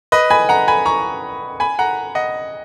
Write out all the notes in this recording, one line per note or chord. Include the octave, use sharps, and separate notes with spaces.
B4 D#5
G#5 B5
F#5 A#5
G#5 B5
A#5 C#6
G#5 B5
F#5 A#5
D#5 F#5